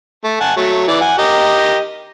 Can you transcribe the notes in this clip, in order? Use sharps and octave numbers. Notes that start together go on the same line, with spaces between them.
A3
F#5 G#5 A5
F#3 A3
E3 D5
F#5 G#5
G4 A#4 D#5